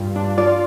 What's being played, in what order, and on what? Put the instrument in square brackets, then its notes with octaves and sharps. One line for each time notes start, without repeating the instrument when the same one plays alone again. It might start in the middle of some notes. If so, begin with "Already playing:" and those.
Already playing: [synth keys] G2 F4
D4
[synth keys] F4 [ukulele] D5